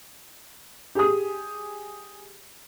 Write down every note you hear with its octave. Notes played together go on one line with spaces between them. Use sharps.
G4 G#4 D#6